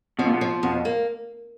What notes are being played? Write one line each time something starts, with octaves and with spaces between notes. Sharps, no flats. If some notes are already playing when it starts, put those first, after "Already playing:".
B2 F3
A#2
B2
F3
F2 B2
A#3